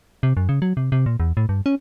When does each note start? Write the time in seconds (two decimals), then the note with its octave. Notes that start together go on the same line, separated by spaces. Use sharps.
0.23 C3
0.37 F#2
0.49 C#3
0.62 F#3
0.77 C3
0.92 C3
1.06 A#2
1.20 E2
1.37 A2
1.49 G2
1.66 C#4